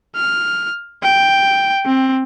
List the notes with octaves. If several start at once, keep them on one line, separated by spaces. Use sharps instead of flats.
F6
G5
C4